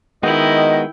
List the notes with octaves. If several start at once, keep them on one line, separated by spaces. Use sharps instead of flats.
D#3 G#3 B3 E4 F#4 D#5 G5